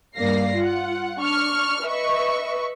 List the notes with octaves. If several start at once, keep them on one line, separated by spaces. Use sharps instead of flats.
G2 A#3 D5 F5 A#6 C7
F4 F#5
D4 C#6 F6
B4 D#5 E5 C#6